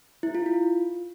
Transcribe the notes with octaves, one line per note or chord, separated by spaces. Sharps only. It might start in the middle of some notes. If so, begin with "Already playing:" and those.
E4
F4
F4